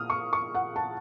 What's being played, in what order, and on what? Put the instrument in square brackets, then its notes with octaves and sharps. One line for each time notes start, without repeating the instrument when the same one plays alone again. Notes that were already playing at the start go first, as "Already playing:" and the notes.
Already playing: [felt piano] A#2 A#3 D#6 F6
C#6
C#6
F#5
A5